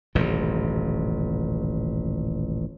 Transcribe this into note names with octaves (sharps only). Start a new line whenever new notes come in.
D#1 A1 F#2 C3